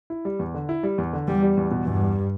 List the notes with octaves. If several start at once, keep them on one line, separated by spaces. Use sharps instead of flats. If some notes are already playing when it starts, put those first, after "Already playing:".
E4
G3
E2
D3
E4
G3
E2
D3
E2 G3
G3
E2
B2
E2 G2
G3